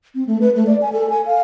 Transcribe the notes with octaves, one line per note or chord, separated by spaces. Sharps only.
C4
A3
B4
A3
D5
G#5
A4
G#5
F5